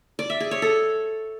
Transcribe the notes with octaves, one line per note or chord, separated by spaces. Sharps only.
D5
E5
G#4
C#5
A4